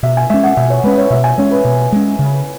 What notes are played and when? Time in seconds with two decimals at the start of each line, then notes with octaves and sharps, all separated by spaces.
0.03 B2 E5
0.17 G#5
0.30 G#3 C#4 E5
0.44 F#5
0.57 B2 E5
0.70 C#5
0.84 G#3 C#4 B4
0.98 C#5
1.10 B2 E5
1.24 G#5
1.38 G#3 C#4 C#5
1.51 B4
1.65 B2
1.92 G#3 C#4
2.19 C#3